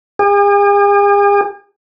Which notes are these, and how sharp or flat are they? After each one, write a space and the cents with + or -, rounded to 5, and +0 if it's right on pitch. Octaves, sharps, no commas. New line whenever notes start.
G#4 -45